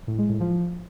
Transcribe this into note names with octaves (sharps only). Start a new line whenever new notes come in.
A2
G#3
A2
F3